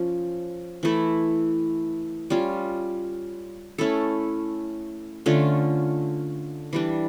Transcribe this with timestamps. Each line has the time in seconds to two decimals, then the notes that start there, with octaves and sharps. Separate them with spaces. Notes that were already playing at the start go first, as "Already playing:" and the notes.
Already playing: F3 C#4
0.83 E3 A3 E4
2.30 G3 C#4 F4
3.78 A3 C#4 E4 A4
5.26 D3 A3 C#4 F4
6.73 E3 G3 D4